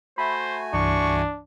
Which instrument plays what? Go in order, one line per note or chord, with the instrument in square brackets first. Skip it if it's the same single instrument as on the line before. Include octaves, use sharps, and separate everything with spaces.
[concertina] A3 F#4 G#5 [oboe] C5 [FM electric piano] E5 B5
[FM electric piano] C2 G2 E3 [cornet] D4 [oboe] C#6